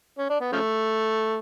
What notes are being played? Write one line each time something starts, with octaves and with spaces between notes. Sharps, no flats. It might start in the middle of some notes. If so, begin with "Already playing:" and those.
C#4
D4
B3
C#3 F3 A3